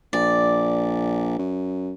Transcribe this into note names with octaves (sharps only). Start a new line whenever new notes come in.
A#1 D5
F#2